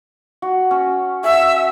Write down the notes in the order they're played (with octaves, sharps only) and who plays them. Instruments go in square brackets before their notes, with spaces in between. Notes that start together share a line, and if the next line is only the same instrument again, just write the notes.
[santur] F#4
C#4
[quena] E5 [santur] F#5 G#5 A5